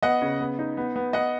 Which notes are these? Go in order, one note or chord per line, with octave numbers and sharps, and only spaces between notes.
B3 D#5 F#5
C#3
B3
D#4
B3
B3
B3 D#5 F#5